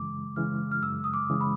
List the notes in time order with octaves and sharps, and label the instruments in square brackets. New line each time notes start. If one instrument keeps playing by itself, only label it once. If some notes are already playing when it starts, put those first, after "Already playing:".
Already playing: [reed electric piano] F#2 C#3 E3 G#3 [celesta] D6
[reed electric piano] C#3 E3 G#3 [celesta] F6
[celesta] F6
[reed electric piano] F#2 [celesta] E6
[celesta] D#6
D6
[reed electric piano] C#3 E3 G#3
[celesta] B5